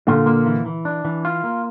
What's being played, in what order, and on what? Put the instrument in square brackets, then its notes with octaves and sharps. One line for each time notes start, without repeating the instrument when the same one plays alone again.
[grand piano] A#2 D3 [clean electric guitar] F4
[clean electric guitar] A#3
E3
E3
D4
E3
F4
A#3